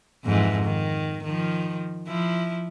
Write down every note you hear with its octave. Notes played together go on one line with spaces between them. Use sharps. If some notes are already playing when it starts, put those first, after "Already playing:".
F2 G#2 E3
D#3
D#3 F3
F3 E4